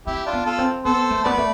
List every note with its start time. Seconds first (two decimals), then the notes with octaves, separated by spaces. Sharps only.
0.06 C4 E4 G4
0.26 D4 F4
0.33 B3
0.46 F4 A4
0.59 C4
0.85 B3 A4 C5
1.11 A3
1.24 B3 B4 D5
1.38 A3